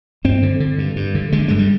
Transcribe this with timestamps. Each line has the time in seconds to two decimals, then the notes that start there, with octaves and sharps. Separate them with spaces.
0.24 G2 C4
0.43 D3
0.60 D3
0.78 G2
0.96 G2
1.15 D3
1.32 D3 G#3
1.48 G2 G#3
1.59 G3